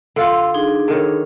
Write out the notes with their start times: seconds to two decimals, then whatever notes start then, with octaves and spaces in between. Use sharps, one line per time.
0.16 D3 F4 F#5 E6
0.54 D4 D#4 G#4
0.88 D3 D#3 C#5